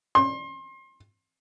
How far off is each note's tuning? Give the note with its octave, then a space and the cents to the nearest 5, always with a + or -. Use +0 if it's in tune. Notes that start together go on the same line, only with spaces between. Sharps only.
C6 +30